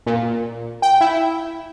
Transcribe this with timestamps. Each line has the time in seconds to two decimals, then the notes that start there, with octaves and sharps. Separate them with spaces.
0.06 A#2
0.82 G5
1.01 E4